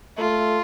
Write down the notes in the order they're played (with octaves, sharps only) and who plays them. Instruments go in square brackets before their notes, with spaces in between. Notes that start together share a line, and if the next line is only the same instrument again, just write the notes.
[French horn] A3 [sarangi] F4